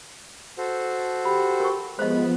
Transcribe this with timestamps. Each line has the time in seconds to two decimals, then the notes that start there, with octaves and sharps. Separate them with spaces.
0.58 F#4 A4 C5
1.25 G4 B5
1.60 A#4 C#6
1.99 F3 G#3 B3 C5 D#5 B5